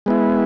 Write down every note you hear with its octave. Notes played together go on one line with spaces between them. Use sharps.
G#3 B3 E4